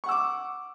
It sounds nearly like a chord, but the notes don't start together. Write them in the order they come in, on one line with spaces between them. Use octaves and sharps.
C#6 F#5 E6 D6